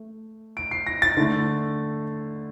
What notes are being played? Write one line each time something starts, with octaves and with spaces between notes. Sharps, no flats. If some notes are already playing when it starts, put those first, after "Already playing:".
Already playing: A3
D7
C7
A#6
A6
D3 A3